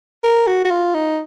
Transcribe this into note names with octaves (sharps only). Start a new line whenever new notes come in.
A#4
F#4
F#4
F4
D#4